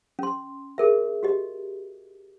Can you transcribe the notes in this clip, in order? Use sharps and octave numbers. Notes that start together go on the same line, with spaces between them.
C#4 C6
G#4 A#4 E5
F#4 G4 D#5